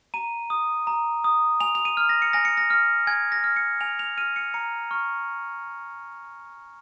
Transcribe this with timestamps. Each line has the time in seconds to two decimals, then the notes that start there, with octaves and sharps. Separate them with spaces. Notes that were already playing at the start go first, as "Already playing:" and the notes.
0.14 A#5 D#7
0.50 D#6
0.87 A#5
1.24 D#6
1.60 G#5 F7
1.75 F7
1.85 D#7
1.97 F6
2.09 A#6
2.22 C#7
2.33 G#5 A#6
2.45 C#7
2.57 A#6
2.70 F6
3.07 G#5 G#6
3.32 A#6
3.44 F6
3.56 C#7
3.81 G#5 F7
3.99 F7
4.17 F6 D#7
4.36 C#7
4.54 A#5 C#7
4.91 C#6 F6